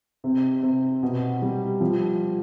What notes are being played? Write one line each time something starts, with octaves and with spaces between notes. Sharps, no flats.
C3
C3
B2
G3
F3